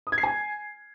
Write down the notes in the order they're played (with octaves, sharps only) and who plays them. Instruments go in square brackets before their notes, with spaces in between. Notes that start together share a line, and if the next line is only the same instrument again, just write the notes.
[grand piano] D#6
G#6
C7
G#5